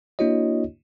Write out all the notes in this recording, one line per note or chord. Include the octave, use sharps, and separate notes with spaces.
A#3 D4 E4 F#4 C#5 D#5